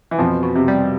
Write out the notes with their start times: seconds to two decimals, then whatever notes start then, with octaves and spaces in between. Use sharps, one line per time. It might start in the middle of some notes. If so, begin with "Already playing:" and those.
0.11 E3
0.18 F2 B2 F3
0.43 B2
0.55 C3
0.68 G3